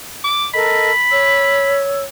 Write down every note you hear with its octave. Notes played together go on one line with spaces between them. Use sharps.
D6
A4 A#4 D#5 B5
C#5 E6